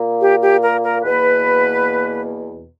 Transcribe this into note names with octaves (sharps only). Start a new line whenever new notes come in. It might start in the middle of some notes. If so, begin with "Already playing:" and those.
Already playing: A#2 A#3
G4
G4
A#4
A#4
E2 B2 A#3 B4